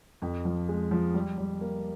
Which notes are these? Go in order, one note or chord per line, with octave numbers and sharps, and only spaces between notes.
F2
F3
G#3
F3
G3
G3
A#3